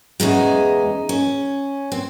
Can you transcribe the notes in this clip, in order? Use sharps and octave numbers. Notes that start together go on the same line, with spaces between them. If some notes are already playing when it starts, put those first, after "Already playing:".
E2 C#3 G#3 D#4
C#4
C4